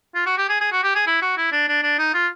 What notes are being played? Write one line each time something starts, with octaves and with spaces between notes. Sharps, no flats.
F4
F#4
G4
G#4
G#4
F#4
G4
G#4
E4
F#4
E4
D4
D4
D4
D#4
F4